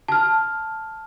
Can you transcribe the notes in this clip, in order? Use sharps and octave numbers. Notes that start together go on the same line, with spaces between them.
A5 F6